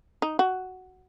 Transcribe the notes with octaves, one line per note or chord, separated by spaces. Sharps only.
D#4
F#4